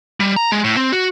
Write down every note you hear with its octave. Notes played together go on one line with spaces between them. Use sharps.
G3
A#5
G#3
A2
C4
F#4